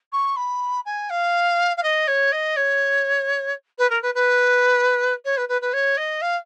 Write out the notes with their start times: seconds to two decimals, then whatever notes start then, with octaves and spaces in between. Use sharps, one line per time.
0.12 C#6
0.36 B5
0.85 G#5
1.10 F5
1.77 F5
1.83 D#5
2.07 C#5
2.32 D#5
2.56 C#5
3.78 B4
3.90 A#4
4.02 B4
4.14 B4
5.25 C#5
5.37 B4
5.48 B4
5.61 B4
5.73 C#5
5.97 D#5
6.21 F5